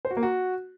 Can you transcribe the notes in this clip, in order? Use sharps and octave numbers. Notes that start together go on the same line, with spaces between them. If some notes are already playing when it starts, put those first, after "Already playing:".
C5
F#4
A#3
F#4